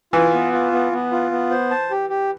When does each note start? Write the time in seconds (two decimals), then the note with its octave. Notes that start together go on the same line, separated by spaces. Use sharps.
0.13 E3 F4
0.33 B3
0.52 F4
0.72 B3
0.92 B3
1.11 F4
1.31 B3
1.50 C5
1.71 A5
1.90 G4
2.09 G4